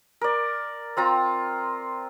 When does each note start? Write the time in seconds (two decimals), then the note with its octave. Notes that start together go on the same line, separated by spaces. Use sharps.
0.21 A#4 D5
0.97 C4 F4 A#5